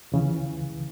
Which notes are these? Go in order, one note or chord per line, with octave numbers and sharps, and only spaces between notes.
C#2 C#3 E3